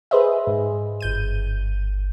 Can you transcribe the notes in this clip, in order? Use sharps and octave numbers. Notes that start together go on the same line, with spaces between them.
G#4 B4 C5 D#5 E5
G#2
G1 G6 D#7